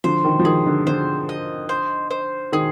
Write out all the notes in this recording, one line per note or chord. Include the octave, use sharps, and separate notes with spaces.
D3 F3 C5
D#3
F3
D#3 G#4
D3
D3 C5
D#5
C5
C5
D#3 G#4